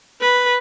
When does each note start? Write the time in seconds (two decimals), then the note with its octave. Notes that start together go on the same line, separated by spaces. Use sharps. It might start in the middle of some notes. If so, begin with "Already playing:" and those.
0.21 B4